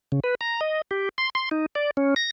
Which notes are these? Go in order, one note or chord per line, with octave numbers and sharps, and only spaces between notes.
C#3
B4
A#5
D#5
G4
C6
C6
D#4
D5
C#4
A#6